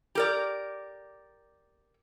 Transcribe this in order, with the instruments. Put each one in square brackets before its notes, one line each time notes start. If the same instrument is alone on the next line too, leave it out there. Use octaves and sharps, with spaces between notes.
[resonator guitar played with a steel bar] G4 A#4 D5